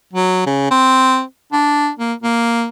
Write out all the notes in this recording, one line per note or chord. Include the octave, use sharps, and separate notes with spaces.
F#3
C#3
C4
D4
A#3
A#3